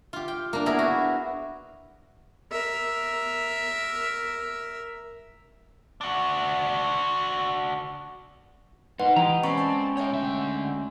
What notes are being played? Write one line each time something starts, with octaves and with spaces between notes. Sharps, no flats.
F4 G4
G5
A#3 D4
B3 E4 G#4 A#4
F#4
A#4 E5
D4 F#4
D#4 B4 C5 F#5
E3 G4 D#5 G5 A#5
G#3 C4 C#4 D5 B5 C#6
A5
C#5 E5 G5
D2 E5